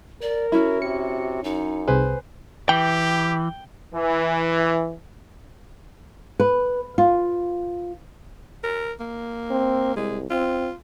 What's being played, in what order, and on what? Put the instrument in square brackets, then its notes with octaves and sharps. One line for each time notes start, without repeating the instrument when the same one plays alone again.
[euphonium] A#4 [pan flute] D5
[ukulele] C#4 E4 [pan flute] F#4
[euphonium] C3 [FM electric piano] C#7
[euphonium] F#2 [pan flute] D#4
[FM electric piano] C2 C3 G#4 [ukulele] B4 C5 G#5
[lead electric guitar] E3 [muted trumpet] G4 [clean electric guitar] G5
[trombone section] E3
[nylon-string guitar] B4
F4
[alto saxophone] A#4
A#3
[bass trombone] C4
[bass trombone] C2 [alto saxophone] G#3
[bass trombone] C4 [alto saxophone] F4